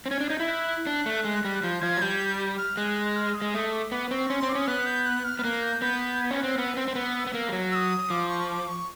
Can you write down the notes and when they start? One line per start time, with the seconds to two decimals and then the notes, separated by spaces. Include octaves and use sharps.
0.06 C4
0.11 C#4 G#6
0.20 D4
0.29 D#4 G6
0.40 E4
0.48 F#6
0.87 D4
1.06 A3
1.24 G#3
1.45 G3
1.63 F3 G6
1.82 F3 G#6
1.97 F#3
2.02 G3 G6
2.58 F6
2.77 G#3 F#6
3.16 F6
3.34 D#6
3.42 G#3
3.54 A3 D#6
3.72 D6
3.92 B3 D6
4.10 C4 C#6
4.29 C#4 C6
4.40 C4 C6
4.49 D6
4.55 C#4 D#6
4.67 B3 F#6
4.86 G6
5.06 F#6
5.25 F6
5.39 B3
5.44 A#3 F#6
5.62 G6
5.82 B3 G6
6.20 G#6
6.31 C#4
6.39 C4 F#6
6.57 B3 E6 F6
6.77 C4
6.88 C4
6.95 B3
7.27 B3
7.34 A#3
7.48 G3
7.52 F#3
7.72 E6
7.75 D#6
8.10 F3 D6
8.29 C#6
8.48 D6
8.68 C#6